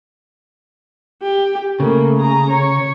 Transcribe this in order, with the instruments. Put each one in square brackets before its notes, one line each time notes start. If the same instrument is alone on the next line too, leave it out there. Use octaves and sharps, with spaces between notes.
[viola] G4
[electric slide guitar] C#3 [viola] A3 A#3
[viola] G#4 A#5
C#5